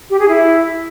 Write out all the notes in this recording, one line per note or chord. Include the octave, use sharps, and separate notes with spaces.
G4
G#4
E4